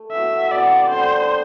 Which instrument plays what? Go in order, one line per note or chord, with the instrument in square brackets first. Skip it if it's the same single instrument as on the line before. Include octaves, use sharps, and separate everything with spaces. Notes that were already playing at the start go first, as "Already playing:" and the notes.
Already playing: [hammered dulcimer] A3
[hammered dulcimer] E3 B3 F#4 [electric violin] E5
[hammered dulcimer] C3 E3 B3 F#4 [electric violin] D5
[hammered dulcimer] D3 G3 D4 [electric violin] C5